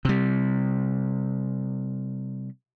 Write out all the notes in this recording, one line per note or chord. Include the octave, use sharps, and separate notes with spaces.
C3 G3